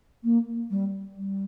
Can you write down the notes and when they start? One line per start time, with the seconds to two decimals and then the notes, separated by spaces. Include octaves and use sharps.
0.24 A#3
0.70 G3
1.16 G3